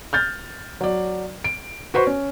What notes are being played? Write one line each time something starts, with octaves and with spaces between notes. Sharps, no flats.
F6 G6 A6
F#3 D5
D7
F#4 B4 C5 C#6
C#4